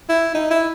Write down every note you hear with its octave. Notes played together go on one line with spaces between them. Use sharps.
E4
D#4
E4